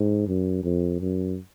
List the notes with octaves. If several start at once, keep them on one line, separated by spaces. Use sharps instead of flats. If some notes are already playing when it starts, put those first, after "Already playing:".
Already playing: G#2
F#2
F2
F#2